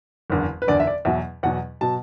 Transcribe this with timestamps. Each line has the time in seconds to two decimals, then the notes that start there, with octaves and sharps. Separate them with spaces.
0.30 F#1 E2 D3
0.62 B4
0.67 F#1 E2 D3 D5
0.80 E5
0.87 D5
1.05 E2 B2 F#3 E5
1.43 E2 B2 F#3 F#5
1.81 B2 F#3 A5